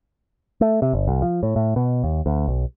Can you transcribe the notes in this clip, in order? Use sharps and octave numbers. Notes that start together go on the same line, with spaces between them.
A3
C3
G1
C2
F3
A2
A2
B2
D#2
D2
B1